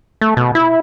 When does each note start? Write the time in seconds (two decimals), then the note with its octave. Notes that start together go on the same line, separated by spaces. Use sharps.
0.21 A3
0.37 B2
0.55 E4